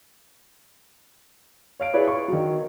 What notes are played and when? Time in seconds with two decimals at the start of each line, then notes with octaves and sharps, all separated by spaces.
1.80 C#5 F5 D7
1.93 E4 G#4 B4 C#5 D5
2.08 C#6
2.28 D#3 F#3